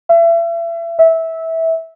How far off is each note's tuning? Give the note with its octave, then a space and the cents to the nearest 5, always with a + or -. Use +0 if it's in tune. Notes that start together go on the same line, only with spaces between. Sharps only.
E5 +35
E5 -20